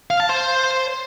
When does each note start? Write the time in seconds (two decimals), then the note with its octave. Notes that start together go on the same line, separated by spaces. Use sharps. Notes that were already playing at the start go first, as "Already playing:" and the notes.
0.11 F5
0.20 A5
0.29 C5